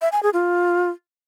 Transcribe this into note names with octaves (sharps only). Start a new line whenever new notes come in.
E5
G#5
G#4
F4